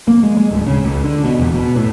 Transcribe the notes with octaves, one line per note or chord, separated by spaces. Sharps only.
A#3
G#3
G#3
D1
C#3
C#2
D3
B2
E1
B2
A2